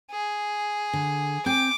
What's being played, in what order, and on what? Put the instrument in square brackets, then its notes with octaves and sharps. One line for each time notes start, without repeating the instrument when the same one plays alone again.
[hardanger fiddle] G#4
[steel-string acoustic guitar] D3
[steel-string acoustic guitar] C4 G5 G#5 [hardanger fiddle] D6